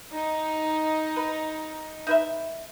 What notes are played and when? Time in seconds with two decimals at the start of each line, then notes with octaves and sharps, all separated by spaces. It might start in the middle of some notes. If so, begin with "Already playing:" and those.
0.11 D#4
1.16 B4
2.07 D#4 B4 E5